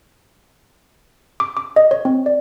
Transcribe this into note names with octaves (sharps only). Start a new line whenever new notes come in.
D6
D6
D#5
C#5
C4
D5